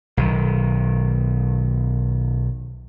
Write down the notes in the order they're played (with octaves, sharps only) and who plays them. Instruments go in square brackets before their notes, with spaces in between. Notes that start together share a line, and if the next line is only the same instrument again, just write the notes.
[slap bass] B1 D#3